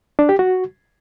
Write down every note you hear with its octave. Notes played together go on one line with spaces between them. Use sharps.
D4
G4
F#4